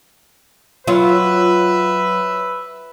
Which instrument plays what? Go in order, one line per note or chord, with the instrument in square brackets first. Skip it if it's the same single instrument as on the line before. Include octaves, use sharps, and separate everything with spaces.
[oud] F#3 F4 [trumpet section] B4 E5